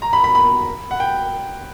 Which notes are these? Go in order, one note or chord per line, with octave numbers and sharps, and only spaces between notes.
A#5
B5
B5
B5
F#5
G5